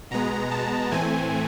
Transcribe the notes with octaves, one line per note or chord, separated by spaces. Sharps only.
B2 G#3 B3 A#5
A5
A2 E3 A3 C4 G#5